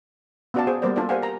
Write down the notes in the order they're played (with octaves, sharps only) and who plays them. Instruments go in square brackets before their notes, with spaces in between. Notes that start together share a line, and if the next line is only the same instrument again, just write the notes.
[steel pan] B3 C#4 F#4 D5 F5 A5
G#4 C5
G3 A#3 B3 A#4 C5 D5
D4 F4 A4 D5 G5
G4 A#4 C5 F5 F#5 G#5
A#4 A#5